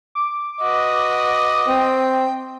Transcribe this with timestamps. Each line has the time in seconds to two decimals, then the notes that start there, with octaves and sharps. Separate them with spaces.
0.15 D6
0.61 F#4 B4 D#5
1.68 C4 G5